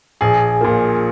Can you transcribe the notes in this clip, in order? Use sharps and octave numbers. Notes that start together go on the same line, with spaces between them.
A#1 G#4
A#2 F3 A#3